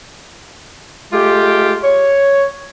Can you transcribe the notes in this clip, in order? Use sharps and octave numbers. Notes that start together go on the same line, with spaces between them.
G#3 A3 F4 G4
C#5